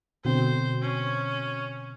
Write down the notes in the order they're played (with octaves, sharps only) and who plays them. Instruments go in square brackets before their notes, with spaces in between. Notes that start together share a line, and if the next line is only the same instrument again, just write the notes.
[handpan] B2 D3 C4 [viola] C5
[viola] C#4